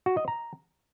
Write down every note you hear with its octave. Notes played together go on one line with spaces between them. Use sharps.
F#4
D#5
A#5